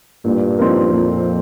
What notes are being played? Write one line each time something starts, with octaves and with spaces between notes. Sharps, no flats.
G2 A#2
F3 C4 D#4 A#4
F2 A#2